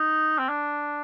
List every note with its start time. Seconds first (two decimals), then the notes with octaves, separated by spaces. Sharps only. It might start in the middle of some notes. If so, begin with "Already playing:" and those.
Already playing: D#4
0.39 C4
0.49 D4